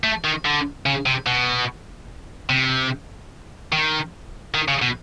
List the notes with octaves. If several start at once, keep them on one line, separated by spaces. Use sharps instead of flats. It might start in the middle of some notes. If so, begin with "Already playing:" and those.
A3
D#3
D3
C#3
C3
B2
C3
D#3
D#3
C#3
B2